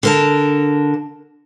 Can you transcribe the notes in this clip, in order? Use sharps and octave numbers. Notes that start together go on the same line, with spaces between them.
D3 A#4 A5